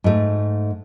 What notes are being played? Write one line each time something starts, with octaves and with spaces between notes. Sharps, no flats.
G#2 A3